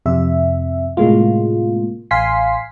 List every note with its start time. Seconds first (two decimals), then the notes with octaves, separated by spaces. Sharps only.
0.06 F2 C3 E5
0.97 A2 C3 G#3 A#3 F4
2.11 A1 F5 G#5 C6 B6 C7